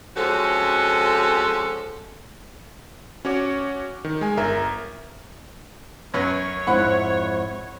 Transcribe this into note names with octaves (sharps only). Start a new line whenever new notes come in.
F3 G#3 C4 C#4 F#4 A4
C#4 F#4 C#5 D6
D#3
G#3 G#5
G1 A#4 E5 A#5
F#2 C#4 B4 C#5
F2 G#2 E4 F#5 B5